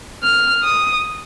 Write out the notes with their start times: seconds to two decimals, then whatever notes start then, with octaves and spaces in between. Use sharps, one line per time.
0.23 F6
0.63 D#6